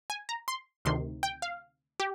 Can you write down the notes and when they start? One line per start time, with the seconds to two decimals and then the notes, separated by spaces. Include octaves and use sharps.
0.10 G#5
0.29 A#5
0.48 C6
0.85 D2 C3 D#3 C6
1.23 G5
1.42 F5
2.00 G4